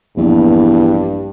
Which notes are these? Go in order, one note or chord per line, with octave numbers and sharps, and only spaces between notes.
A#1 E2 G2